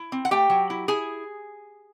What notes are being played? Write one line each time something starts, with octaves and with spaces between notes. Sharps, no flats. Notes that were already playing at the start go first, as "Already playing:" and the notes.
Already playing: E4
C4
F#5
A3 G4 G5
F#3
E4
E4 G#4 G#5